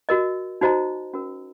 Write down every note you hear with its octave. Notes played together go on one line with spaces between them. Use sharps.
F#4 A#4 D#5
D#4 F#4 C5 D#5 A#5
C#4 F#4 A#4